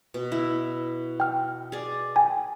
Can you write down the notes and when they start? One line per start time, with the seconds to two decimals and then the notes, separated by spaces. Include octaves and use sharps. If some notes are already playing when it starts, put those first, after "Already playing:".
0.14 B2
0.32 E4
1.20 G5 F6
1.72 G#4 D5
2.16 G5 G#5